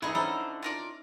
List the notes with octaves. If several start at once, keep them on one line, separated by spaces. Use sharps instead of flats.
D3 E3 D#4 E4 G#4 D#5
C#4 D#4 E4 A4 C5 A#5
F4 A#4 D5